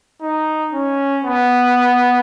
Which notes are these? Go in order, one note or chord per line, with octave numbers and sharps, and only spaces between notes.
D#4
C#4
B3